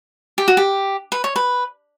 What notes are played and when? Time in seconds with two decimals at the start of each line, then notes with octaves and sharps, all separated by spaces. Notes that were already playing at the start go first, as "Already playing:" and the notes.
0.38 G4
0.48 F#4
0.57 G4
1.12 B4
1.24 C#5
1.36 B4